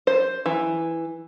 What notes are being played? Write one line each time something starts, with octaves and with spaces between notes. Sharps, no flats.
C5
E3